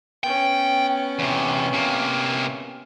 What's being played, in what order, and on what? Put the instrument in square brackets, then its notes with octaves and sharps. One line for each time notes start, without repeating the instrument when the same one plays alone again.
[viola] B3 C#4 [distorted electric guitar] G5
[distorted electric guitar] E2 C3
C3 A#3